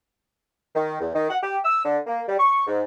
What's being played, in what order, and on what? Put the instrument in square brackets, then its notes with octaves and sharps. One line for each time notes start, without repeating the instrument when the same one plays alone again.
[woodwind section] D#3
E2
D#3
F#5
G4
E6
D3
A#3
G3
C#6
G#2